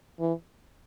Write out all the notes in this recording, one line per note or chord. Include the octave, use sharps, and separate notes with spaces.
E3